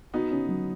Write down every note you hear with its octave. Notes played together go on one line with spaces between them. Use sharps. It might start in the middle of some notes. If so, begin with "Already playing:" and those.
B3 D#4 F#4
C#4
F#3